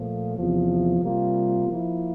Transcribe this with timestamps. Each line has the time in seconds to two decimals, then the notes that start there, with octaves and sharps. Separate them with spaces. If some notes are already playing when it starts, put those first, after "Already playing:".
Already playing: A#2 F3 A3
0.36 E2 C3 F3
1.02 C3 G3 A#3 F4
1.67 F3 A#3 E4